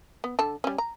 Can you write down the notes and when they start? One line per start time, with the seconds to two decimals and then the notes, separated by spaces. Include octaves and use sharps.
0.24 B3
0.39 D3 A4 A5
0.64 G3 C#4
0.78 A#5